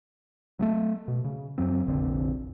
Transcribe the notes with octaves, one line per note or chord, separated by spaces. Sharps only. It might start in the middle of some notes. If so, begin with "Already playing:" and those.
F#3 G#3 A3
B2
C#3
F#2 F#3 C4
F1 A#1 D3 C4